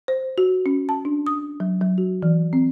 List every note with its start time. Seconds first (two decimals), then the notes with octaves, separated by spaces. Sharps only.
0.08 C5
0.38 F#4
0.66 C#4
0.89 A5
1.05 D4
1.26 D#6
1.60 F#3
1.82 F#3
1.98 F#4
2.22 E3
2.53 C4